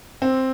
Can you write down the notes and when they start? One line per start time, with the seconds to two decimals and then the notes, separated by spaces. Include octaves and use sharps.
0.22 C4